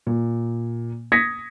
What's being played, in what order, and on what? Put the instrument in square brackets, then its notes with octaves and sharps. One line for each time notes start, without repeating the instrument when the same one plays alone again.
[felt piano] A#2
D#6 G#6 A#6 B6 C#7